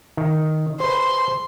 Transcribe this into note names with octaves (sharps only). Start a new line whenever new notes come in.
D#3
B4 C5 C6